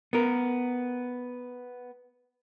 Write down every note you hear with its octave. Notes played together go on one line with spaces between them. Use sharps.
B3 A#4